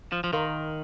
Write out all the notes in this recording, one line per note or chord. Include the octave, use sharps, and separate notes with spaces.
F3
F3
D#3 A#4 F5 C6